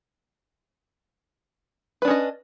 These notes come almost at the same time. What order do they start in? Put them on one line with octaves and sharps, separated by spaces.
B4 D4 C#4 D#5